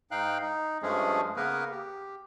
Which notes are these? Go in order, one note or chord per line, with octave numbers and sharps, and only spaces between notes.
G#2 D#4 F5 G5 F#6
D#4
G2 F3 G#3 A3 C#4 G#4
C#3 A#3 B3 A#4 B4
G4